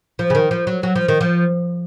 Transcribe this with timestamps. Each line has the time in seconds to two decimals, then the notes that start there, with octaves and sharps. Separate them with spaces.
0.19 F3
0.30 C#3
0.35 D#3
0.51 F3
0.67 F#3
0.83 F#3
0.96 F3
1.08 D#3
1.21 F3